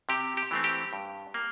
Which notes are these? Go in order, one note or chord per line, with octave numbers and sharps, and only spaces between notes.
C3 G4
G4
E3 A3 C4
G4
G2
A#3